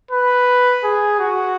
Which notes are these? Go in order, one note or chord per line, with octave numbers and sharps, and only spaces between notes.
B4
G#4
F#4